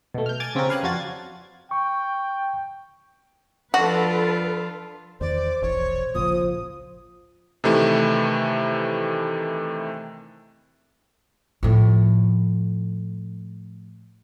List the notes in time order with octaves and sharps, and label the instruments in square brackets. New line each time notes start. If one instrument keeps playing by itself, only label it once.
[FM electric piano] B2 A3
F6 G6
G#5 D6 G#6 A6
C#3 C4 C#4 F4 G4 A#4
B4 F5 G#5 F#6
F2 D4 F4 F#4 G#6 A6
[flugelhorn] G5 [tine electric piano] C#6
[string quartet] F3 D4 F4 [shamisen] F#4 [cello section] A4 B4
[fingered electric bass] E2 D#3 [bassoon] C5 [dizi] D5
[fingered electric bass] E1 A#1 E2 [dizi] C#5
[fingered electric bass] G#1 C#2 A#2 [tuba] F3 [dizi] D#6
[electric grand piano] C3 D#3 E3 A3 E4
[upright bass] A2 F3